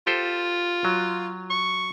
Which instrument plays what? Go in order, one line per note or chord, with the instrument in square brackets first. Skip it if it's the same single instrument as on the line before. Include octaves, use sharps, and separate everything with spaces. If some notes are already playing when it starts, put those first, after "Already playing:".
[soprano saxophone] F4 [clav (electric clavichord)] G4 A4 C5
[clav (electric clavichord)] F#3
[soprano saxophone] C#6